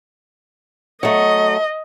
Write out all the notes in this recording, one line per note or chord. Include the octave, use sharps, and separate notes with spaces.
F#3 A3 D#5